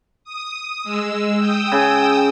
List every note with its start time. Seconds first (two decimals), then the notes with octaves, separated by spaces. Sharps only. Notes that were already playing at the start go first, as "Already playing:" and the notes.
0.24 D#6
0.84 G#3 E6
1.39 G5 D#6 E6
1.72 C#3